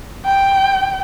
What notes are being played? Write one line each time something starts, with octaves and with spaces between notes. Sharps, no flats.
G5